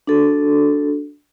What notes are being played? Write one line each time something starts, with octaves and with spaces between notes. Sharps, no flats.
D4 F#4 A4